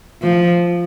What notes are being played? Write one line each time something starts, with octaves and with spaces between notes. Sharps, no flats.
F3